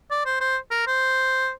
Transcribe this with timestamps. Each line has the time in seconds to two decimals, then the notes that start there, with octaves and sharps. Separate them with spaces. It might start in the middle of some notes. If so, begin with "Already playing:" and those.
0.11 D5
0.26 C5
0.41 C5
0.71 A#4
0.87 C5